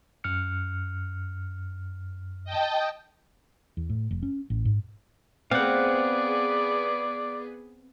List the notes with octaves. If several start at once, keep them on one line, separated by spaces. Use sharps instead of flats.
F#2 F6 C#7
D#5 G5 A5
E2
A2
F1
C#4
A1
G#2
B3 C4 G#4 D5 F5 F#5